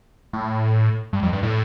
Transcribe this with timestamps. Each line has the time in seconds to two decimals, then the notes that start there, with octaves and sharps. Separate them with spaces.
0.33 A2
1.13 G2
1.23 F2
1.33 G2
1.43 A2